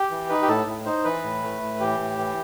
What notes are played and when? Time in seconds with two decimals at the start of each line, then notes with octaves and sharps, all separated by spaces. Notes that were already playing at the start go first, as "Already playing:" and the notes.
Already playing: G4
0.11 E3
0.29 D#4 B4
0.42 G4
0.48 A2 A4
0.67 A2
0.86 D#4 C5
1.04 E3 B4
1.24 A2
1.43 A3
1.62 A2
1.80 E3 G4
2.00 A2
2.18 E3